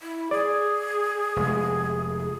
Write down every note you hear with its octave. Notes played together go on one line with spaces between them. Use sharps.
E4
G#4 D5
F1 G#3